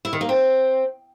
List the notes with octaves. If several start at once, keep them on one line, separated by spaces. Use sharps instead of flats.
E4
D#3
A#3
C4